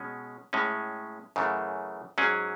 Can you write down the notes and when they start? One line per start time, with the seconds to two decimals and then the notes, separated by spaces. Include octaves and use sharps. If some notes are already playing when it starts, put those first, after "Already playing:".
Already playing: B2 G#3 C#4
0.53 A2 G#3 C#4
1.36 F#2 C#3 E3 A3
2.18 G#2 F#3 C#4 G#4